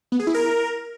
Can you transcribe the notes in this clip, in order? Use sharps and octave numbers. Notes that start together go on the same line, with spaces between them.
B3
G#4
E4
A#4